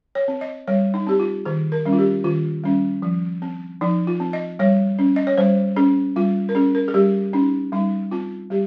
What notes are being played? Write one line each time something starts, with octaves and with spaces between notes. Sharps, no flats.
C#5
C4
D#5
G3 C#5
D#4
C4 G4
F4
D#3 G#4
A#4
G3 C#4
F4
G4
D#3 F4
G3 C#4
F3
C4
F3 D#4
F4
C4
D#5
G3 C#5
C#4
D#5
C#5
G3 C5
C#4 G#4
G3 F4
A#4
C#4 G#4
A#4
G#4
G3 G4
C#4 D#4
G3 D#4
C4 F4
G3 G4